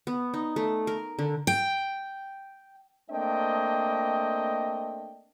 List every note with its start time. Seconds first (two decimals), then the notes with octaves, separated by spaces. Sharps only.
0.07 B3
0.34 D#4
0.56 A3
0.87 A#4
1.19 D3
1.47 G5
3.11 A3 A#3 C4 D4 D#5 G5